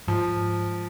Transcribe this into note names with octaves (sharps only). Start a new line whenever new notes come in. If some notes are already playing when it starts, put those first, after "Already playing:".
G#2 F3